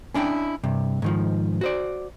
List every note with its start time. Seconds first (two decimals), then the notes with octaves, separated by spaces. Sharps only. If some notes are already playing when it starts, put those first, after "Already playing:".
0.14 C#4 D4 E4 G5
0.63 G2 C3
1.02 G#2 D#3 F3
1.61 F#4 C5 D5